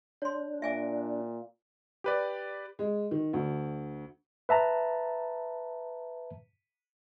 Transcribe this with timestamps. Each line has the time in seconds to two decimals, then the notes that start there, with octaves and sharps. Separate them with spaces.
0.22 D4 C#5 C6
0.62 A#2 E5 G#5 D6
2.04 G4 B4 D5
2.79 G#3
3.11 D#3
3.33 D2
4.49 B4 E5 A5 A#5